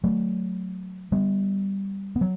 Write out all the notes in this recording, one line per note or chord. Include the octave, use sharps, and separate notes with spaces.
F#3 A3
G3 B3
B3
F#3